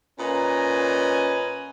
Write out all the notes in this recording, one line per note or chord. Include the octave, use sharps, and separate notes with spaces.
A#2 C#4 B4 D#5 G#5 A#5